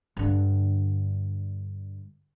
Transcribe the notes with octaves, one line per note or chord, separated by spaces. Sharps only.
G2 D3